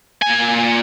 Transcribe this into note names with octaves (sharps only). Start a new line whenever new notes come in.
A#2 G#5